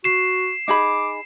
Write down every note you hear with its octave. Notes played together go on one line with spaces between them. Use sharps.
F#4 C7 E7
D#4 G#4 B5 D6